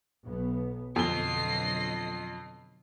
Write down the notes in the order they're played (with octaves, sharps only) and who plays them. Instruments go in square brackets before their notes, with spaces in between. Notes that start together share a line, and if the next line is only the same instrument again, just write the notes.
[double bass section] B1 B3
[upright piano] F2 G7 [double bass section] B2 D3 F#3 [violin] D#5 C7